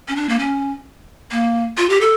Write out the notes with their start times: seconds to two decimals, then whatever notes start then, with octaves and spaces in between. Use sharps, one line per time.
0.08 C#4
0.16 D4
0.29 A#3
0.39 C#4
1.31 A#3
1.77 F4
1.89 G4
2.01 A4